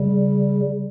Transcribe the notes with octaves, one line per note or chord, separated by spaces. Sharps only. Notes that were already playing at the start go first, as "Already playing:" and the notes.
Already playing: C#3 G3